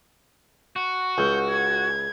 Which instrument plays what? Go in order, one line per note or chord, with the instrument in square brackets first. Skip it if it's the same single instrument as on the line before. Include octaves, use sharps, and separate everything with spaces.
[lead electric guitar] F#4
[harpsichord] C#2 [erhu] G6
[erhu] G#6